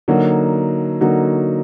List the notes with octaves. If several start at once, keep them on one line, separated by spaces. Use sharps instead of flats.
D3 F#3 A#3 D#4 F#4
D3 F#3 A#3 D#4 F#4